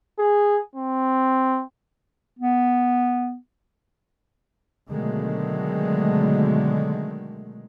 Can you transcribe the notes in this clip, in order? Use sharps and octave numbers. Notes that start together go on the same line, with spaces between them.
G#4
C4
B3
B2 D3 D#3 F#3 G#3 A3